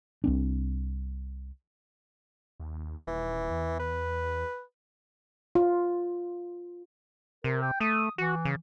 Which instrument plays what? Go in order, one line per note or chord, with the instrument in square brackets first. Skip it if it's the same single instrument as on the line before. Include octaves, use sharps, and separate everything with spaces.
[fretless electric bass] C2 C4 D4
[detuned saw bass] D#2
[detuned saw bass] D#1 [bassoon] E3
[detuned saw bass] E2
[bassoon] B4
[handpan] F4
[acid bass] C3 [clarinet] A#4
[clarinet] G5
[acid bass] A3 [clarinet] D#6
[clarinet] E3 [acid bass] F#4
[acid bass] C#3